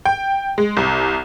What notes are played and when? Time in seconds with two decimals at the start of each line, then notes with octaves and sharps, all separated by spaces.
0.05 G5
0.58 G#3
0.77 C2